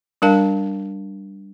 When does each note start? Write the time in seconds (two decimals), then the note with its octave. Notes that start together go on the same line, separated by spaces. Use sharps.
0.22 G3 D4 A#4 F5 A5